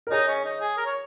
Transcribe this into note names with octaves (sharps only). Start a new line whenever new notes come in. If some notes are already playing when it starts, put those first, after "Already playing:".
A#4
D#4 G#4 C#5
C#4
D#4
G#4
A#4
C#5